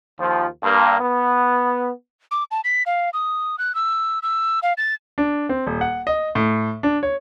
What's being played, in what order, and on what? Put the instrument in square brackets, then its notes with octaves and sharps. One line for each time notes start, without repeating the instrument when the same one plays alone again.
[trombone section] D#2 F3
G2 A#3
B3
[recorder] D6
A5
B6
F5
D#6
F#6
E6
E6
F5
A6
[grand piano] D4
C4
D#1
F#5
D#5
A2
D4
C#5